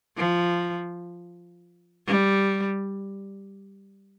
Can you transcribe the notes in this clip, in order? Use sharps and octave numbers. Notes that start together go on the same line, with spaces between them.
F3
G3